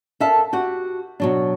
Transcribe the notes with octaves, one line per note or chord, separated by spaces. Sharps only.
A4 A#4 E5 F5 A5
F#4 G4 F#5
B2 F#3 D4